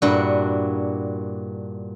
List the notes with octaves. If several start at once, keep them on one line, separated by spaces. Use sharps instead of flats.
G2 A#2 D4 E4 F#4